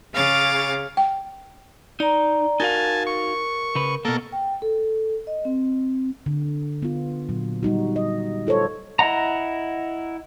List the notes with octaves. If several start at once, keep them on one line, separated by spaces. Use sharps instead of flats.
C#3 G#4 C#5 F5 D6 A6
G5
D#4 D5 A#5
D#4 F#4 A#4 F5 G#5 A5
C#6
C#3 B4
B2 A#3 A4 A#4
G5
A4
D#5
C4
D3
B3 F4
A#2 F#3
G3 D#4 F#4
D#5
F4 A4 C5 C#5
E4 D#5 F#5 A#5